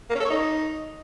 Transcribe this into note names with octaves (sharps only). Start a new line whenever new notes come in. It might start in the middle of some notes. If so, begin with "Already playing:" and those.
A#3
C#4
A4
C#5
D#4